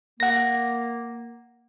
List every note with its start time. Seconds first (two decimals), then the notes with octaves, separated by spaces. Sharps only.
0.20 A#3 F#5 A#6